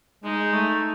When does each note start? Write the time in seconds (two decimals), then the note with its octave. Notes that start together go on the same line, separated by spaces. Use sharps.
0.24 G#3 D#4
0.53 A3